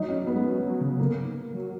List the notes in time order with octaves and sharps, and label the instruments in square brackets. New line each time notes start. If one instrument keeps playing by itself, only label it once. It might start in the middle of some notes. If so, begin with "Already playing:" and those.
Already playing: [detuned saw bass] F#3 [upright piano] D#4
[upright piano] C#4
B3
[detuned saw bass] G#3
F#3
F#3
C#3
[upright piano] A#3
[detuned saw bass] F#3